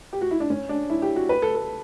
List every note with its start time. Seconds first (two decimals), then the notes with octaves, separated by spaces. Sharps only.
0.13 G4
0.21 F#4
0.31 E4
0.40 D4
0.50 C#4
0.69 D4
0.90 E4
1.02 G4
1.16 F#4
1.29 B4
1.42 A4
1.55 A4